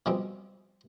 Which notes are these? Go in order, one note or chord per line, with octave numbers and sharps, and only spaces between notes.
B2 F3 G3 G#3 C4